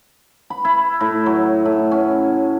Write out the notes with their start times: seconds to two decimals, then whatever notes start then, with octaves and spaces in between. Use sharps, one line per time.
0.50 B5
0.65 E4
1.01 A2
1.26 F#3
1.65 A2
1.91 C#4